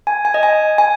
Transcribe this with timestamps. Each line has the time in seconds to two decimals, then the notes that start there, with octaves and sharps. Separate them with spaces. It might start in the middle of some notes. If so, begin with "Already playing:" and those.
0.07 G#5
0.25 G#5
0.34 D#5
0.43 G#5
0.78 G#5